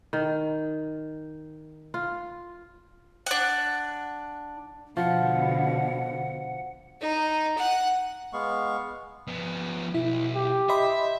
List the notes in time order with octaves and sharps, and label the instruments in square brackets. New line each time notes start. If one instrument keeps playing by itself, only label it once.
[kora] D#3
F4
[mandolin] D4 F#5
[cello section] B2 D3 [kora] F3 [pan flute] F#5
[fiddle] D#4
F#5
[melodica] G#3 B3 F5 C#6
[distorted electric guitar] F3 B3
[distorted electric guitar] B1 [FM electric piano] E4
[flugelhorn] G4
[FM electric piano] D#5 B5 C6 [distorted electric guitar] E5